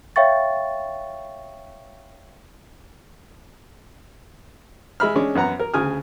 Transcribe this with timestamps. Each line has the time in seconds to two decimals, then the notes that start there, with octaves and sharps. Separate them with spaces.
0.16 C#5 E5 F5 G5 C#6 A6
5.00 G#3 E5 B5 F6
5.16 G#3 C#4 D4
5.35 F#2 B3 F#5 A#5
5.60 A#4
5.74 D2 C#3 G#5 D#6 F6